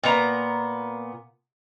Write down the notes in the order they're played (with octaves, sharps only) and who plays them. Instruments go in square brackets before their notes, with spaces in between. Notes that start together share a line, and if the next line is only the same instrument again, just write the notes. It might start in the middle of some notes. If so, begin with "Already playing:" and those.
[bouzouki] A#2 B3 A#5